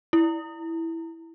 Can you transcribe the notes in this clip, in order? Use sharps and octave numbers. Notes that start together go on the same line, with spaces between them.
E4